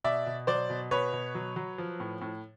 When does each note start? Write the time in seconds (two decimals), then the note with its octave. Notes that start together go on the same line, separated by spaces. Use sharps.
0.04 B2 D5 E5
0.26 B2
0.47 F#3 C5 D5
0.69 B2
0.91 B2 B4 C#5
1.13 B2
1.35 F#3
1.56 F#3
1.78 F3
2.00 A2
2.21 A2